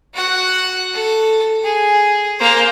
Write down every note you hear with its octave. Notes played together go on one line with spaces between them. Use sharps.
F#4 F#5
A4
G#4
A#3 C5